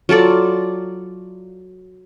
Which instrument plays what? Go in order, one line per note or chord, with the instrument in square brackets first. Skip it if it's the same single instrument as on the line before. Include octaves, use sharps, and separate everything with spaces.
[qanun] F#3 F4 A4 D5